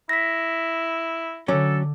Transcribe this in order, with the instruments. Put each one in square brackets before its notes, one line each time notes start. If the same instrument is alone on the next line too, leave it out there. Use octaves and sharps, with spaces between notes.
[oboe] E4 [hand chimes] A#6 B6
[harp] D3 A5 D6 [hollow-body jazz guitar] F#3 C#4 [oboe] A4